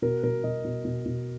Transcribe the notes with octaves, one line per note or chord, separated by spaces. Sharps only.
B2 A#4
B2 A#4
B2 D#5
B2
B2
B2